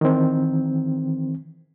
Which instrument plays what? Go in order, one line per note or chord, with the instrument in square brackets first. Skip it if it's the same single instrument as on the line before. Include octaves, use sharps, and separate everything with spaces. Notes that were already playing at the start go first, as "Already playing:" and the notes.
[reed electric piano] D#3 E3 C4